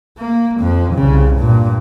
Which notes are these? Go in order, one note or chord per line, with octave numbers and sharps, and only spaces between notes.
A#3
F2 F3
C2 C#3
G2 A#2